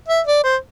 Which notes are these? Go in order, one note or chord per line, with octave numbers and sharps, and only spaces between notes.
E5
D5
C5